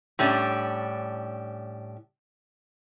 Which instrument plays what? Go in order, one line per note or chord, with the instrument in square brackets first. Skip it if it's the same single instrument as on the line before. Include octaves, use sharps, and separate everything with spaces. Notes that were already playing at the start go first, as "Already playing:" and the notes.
[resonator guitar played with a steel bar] A2 G3 C#4 D4